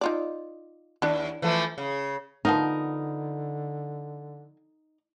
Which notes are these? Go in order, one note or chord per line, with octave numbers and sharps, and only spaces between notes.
D#4 F4 D5
D#2 D4 E4
E3 F3 A3
C#3
D3 F3 B3 D#4 A#4